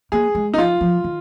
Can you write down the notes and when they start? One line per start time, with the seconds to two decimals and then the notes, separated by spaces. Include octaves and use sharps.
0.12 A#3 G#4
0.35 G#3
0.54 D#4
0.58 F3 F4
0.81 F3
1.04 D#3